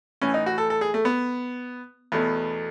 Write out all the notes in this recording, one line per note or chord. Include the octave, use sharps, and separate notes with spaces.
A2 E3 C#4
D#4
F#4
A4
A4
G#4
A3
B3
E2 B2 A3